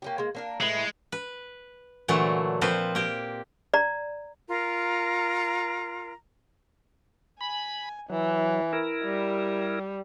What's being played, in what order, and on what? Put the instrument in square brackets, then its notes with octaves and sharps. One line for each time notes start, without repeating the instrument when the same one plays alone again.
[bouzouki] A#3 C#4 G4
G#3 A#3
A#3 D4 A#4
[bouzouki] A2 E4 B4 [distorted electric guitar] G#3
[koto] B4
A#2 D3 E3 F#3 A3
A#2 F3 C4 B4 C5
A#3 G4
[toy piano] D5 A#5
[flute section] F4 A#4 A#5
[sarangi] G#5 [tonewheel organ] B5
[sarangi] E3 [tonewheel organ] F#3
[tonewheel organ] E4 A#4
[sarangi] G3